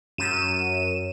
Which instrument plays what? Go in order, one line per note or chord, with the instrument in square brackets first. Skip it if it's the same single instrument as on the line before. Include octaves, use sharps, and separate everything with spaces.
[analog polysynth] F#2 D#7 E7